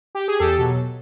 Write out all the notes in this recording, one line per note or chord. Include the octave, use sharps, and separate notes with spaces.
G4
G#4
E2 G4 A4
B2 F#3